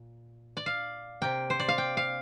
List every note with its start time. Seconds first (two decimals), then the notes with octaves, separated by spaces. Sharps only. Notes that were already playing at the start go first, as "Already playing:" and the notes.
Already playing: A#2
0.57 D5
0.66 F5
1.22 C3 A#3 G5
1.50 C5
1.60 D5
1.69 F5
1.78 G5
1.97 F5